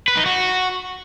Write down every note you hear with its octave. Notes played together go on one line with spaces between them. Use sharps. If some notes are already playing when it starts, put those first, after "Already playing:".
B4
D#4
F#4